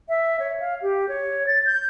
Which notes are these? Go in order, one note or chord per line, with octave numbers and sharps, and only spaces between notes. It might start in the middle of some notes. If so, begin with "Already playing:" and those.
E5
C#5
F5
G4
C#5
A6
G6